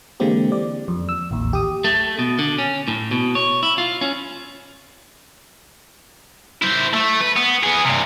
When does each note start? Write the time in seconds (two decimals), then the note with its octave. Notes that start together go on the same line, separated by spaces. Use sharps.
0.20 D3 E3 G#3 A#3 C4 G4
0.52 D5
0.88 F2
1.09 E6
1.31 A1 D#2
1.53 G4 D#6
1.84 A3
2.19 B2
2.39 D3
2.58 C#4
2.88 A2
3.11 B2
3.35 C#5
3.63 E4
3.78 F4
4.01 C#4
6.62 E4 C5
6.94 A3
7.21 B4
7.36 B3
7.63 B3 G#4
7.85 G2 C3